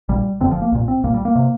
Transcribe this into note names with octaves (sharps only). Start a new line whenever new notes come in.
A#1 A#2 G3
F1 F2 D3 C4
F3
A#3
C2 A#2
C4
C2 A#2 A#3
G3
A#3
C3